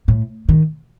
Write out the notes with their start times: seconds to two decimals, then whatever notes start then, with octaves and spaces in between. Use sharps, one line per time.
0.08 A2
0.49 D#3